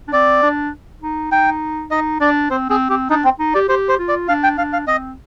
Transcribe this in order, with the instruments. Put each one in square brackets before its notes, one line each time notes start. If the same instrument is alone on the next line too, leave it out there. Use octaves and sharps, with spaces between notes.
[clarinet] D4
[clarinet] C4 [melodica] D5
[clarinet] D4
D#4
[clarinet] D#4 [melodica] G5
[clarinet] D#4 [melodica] D#5
[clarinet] D4 [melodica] D5
[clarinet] C4 [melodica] C5
[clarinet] C4 [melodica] G#4
[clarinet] C4 [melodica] G4
[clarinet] D4 [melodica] D#4
[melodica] C4
[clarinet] D#4
[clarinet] G4 [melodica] D5
[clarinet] G4 [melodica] C5
[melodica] C5
[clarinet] F4
[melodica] D5
[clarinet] D4 [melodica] F5
[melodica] G5
[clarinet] D4 [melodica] F5
[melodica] F5
[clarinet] C4 [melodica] D#5